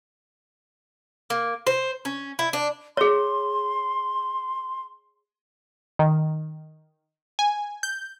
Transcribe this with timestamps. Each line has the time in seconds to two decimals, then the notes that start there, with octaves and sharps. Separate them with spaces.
1.30 A#3
1.67 C5
2.05 C#4
2.39 E4
2.53 D4
2.97 G#4 C#5 C6
5.99 D#3
7.39 G#5
7.83 G6